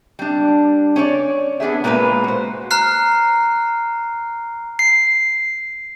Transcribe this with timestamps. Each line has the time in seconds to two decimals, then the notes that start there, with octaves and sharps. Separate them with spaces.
0.19 G3 D4
0.96 C#4 C#5 D5
1.60 B3 D4 G#4 E5
1.84 A#2 G#3 A#3 A#4 B4
2.24 F#4 C5
2.71 A#5 F6 F#6 C7
4.79 C7